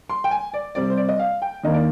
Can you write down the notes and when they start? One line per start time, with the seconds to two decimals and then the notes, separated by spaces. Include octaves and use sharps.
0.10 C6
0.24 G5
0.31 G#5
0.54 D5
0.75 C3 G3 C4 D5
0.90 C5
0.97 D5
1.09 D#5
1.19 F5
1.42 G5
1.64 D#2 D#3 A#3 D4 D#5
1.74 D5